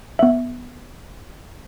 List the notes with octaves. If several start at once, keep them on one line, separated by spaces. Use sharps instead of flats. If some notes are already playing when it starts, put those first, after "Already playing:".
B3 E5